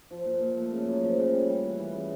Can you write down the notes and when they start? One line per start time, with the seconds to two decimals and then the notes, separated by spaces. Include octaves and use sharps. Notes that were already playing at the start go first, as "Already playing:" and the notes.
0.11 F3
0.26 A#2
0.41 A#2
0.56 A3
0.72 C#3
0.87 F#2
1.02 F3
1.18 C#3
1.33 G3
1.49 G3
1.64 E3
1.79 E3
1.94 C#3